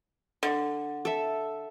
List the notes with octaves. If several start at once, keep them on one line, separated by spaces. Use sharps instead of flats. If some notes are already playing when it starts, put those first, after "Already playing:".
D3
A4 E5